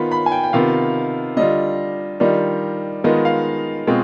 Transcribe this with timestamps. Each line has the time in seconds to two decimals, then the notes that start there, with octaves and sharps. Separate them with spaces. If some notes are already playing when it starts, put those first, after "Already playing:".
Already playing: D#3 B3 F4 B5
0.12 B5
0.26 G#5
0.32 G5
0.43 G5
0.53 C3 D#3 B3 F4 F5
1.37 D3 G3 D4 F4 D#5
2.20 D#3 G3 D4 F4 D#5
3.04 D#3 G#3 B3 F4 D#5
3.25 F5
3.87 B2 G#3 C4 F4